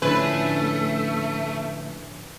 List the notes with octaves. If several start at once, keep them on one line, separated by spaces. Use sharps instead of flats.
A2 D3 F3 A3 C#4 D4 B4